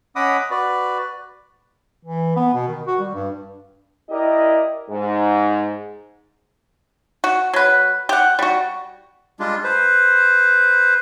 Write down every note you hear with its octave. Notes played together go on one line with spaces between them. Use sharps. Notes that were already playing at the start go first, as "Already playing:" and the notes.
C#4 D#5 F#5 B5 D6 D#6
F#4 B4 D5
E3
B3
B2
D#3
F#4
G3
G2
E4 G4 A#4 D5 D#5
G#2
F#4
F#3 B4
G4 F#5
G3 F#4
G3 G#3 D4 F4
B4 C5